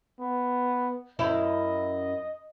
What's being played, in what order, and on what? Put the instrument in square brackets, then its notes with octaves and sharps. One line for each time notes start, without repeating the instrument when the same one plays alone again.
[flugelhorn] B3
[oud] F#2 C#4 E4 [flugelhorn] D#5